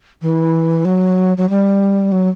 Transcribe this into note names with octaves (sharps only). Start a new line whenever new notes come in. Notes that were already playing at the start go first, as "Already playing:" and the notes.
E3
F#3
F#3
G3
F#3